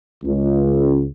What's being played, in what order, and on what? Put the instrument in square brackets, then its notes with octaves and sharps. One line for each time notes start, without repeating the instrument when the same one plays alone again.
[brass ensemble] C#2